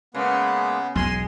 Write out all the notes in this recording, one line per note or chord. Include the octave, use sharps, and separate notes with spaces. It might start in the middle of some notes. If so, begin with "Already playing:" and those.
C#3 G#3 A#3 B3 B4
E1 B1 G#3 G#5 C6